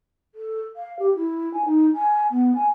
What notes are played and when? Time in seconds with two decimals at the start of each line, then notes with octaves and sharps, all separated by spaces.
0.35 A4
0.76 F5
0.99 G4
1.16 E4
1.53 G#5
1.65 D#4
1.94 G#5
2.31 B3
2.55 G#5